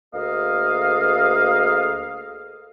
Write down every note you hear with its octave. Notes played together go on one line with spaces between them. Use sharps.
D2 A#3 G#4 A4 D#5 F5